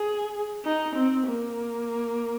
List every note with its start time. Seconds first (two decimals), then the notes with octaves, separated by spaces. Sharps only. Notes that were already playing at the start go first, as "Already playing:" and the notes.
Already playing: G#4
0.65 D#4
0.95 C4
1.26 A#3